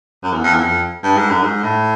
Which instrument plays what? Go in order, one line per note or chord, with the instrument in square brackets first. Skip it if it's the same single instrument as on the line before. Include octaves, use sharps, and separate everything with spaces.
[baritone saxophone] F#2
E2
F2
E2
F2
G2
G#2
F#2
G#2
A2